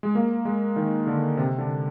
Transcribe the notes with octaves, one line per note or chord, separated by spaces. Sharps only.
G#3
A#3
G#3
D#3
D3
C3
D3